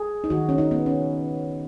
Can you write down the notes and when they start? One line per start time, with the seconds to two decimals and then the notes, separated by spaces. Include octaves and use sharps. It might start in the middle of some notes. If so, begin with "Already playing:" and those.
Already playing: G#4
0.24 D#4
0.30 D#3 F#4
0.49 C#4
0.58 D#4
0.71 B3
0.86 C#4